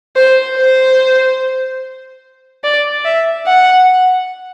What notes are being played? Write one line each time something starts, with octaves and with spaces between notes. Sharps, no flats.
C5
C5
D5
E5
F#5